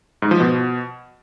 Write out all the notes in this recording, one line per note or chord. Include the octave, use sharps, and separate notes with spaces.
G#2
F3
B2